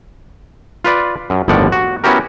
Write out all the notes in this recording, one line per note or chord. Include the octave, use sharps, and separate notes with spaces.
F4 B4 D5
F#2
G1 D#2 A2 F3 D5 F#5
F#4
B3 C#4 E4 F#4 G4 A#4